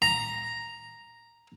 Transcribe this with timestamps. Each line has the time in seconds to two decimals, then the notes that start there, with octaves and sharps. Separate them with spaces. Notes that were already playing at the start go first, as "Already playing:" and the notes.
0.02 A#5